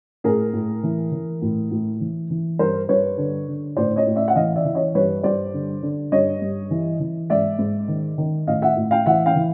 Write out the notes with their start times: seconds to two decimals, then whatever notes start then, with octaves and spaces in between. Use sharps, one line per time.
0.24 A2 G#4 A#4
0.53 A2
0.83 E3
1.12 E3
1.42 A2
1.71 A2
2.01 E3
2.30 E3
2.59 G2 A#4 C5
2.89 G2 B4 C#5
3.18 D3
3.48 D3
3.77 A2 C5 D5
3.96 C#5 D#5
4.07 A2
4.16 D5 E5
4.28 F#5
4.36 E3 D#5 F5
4.56 D5 E5
4.65 E3
4.75 C#5 D#5
4.95 G2 B4 C#5
5.24 G2 C5 D5
5.54 D3
5.83 D3
6.12 G2 C#5 D#5
6.42 G2
6.71 E3
7.00 E3
7.30 G#2 D5 E5
7.59 G#2
7.88 D#3
8.18 D#3
8.47 A2 D#5 F5
8.62 E5 F#5
8.77 A2
8.91 F5 G5
9.06 E3 E5 F#5
9.26 F5 G5
9.36 E3